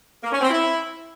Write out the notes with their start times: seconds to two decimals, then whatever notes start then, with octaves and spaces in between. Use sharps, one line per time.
0.23 A#3
0.32 C#4
0.41 C4
0.50 E4